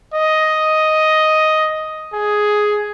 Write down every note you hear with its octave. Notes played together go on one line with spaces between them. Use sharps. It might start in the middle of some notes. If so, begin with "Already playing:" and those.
D#5
G#4